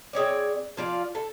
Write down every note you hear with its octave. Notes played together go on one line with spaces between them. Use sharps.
C4 G#4 C#5 D5
F3 F4 D5 F5
A4